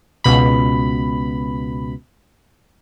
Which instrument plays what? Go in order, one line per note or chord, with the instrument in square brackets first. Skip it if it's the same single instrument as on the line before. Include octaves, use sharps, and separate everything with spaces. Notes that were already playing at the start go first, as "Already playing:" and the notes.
[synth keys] C#2 B2 B5